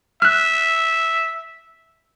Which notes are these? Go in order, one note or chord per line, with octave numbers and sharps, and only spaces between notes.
E5 F6 F#6